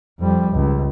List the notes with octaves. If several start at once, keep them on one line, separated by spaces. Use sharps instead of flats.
F2 G3
C#2